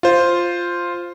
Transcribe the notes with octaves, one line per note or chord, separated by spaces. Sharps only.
F4 C5